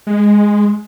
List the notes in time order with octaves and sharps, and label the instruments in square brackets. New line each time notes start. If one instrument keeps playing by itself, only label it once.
[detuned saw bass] G#3